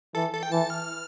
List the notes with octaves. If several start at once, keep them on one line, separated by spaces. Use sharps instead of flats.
E3 A4
A4
G5
E3 A5
F6